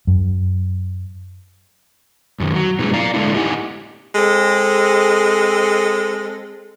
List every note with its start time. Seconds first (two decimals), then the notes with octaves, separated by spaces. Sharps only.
0.07 F#2
2.40 F#2 D#3
2.54 F#3
2.79 B2 F#3 G#3 D4 E4 G#4
2.94 D5 F5 A#5
3.14 D3 G#3 A3 D4 E4
3.34 D#4 E4 G4 D#5 F#5 G#5
4.15 G#3 C4 A4